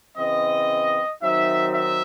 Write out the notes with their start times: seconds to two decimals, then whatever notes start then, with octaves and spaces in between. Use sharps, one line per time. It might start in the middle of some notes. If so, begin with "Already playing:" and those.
0.17 C#3 E3 C4 D#5
1.22 D#3 F#3 C4 D#4 E5
1.74 E5